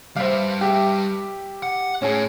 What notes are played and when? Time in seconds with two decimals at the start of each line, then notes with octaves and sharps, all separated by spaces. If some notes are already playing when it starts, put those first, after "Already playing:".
0.16 G3 B4 C5 E5 F5
0.61 G4 E5
1.63 F#5
2.02 A2 C#4 G#4